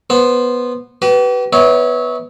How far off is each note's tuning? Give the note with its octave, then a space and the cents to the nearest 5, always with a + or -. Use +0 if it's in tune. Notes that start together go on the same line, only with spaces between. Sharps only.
B3 -10 C5 +0
G4 -45 B4 +0
B3 +0 E4 -35 C#5 +0